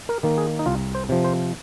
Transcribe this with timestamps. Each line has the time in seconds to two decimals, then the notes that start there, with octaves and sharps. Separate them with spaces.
0.09 A#4
0.23 D#3 A#3
0.38 G#4
0.59 D#4
0.66 C2 F4
0.95 C5
1.09 C3 F3
1.24 C5